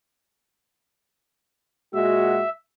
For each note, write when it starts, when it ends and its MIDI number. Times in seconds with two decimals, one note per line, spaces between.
1.94 2.43 46
1.94 2.43 56
1.94 2.43 66
1.94 2.50 76